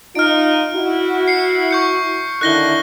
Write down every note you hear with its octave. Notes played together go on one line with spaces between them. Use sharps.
D#4 F4 F6 D7
E4 F#4
C7 C#7
C#6 G6 C#7
D3 D#3 E4 F#6 A#6 G7